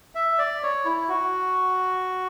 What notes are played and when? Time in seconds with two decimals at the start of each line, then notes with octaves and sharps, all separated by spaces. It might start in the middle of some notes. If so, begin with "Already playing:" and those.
0.15 E5
0.38 D5
0.63 C#5
0.85 E4
1.08 F#4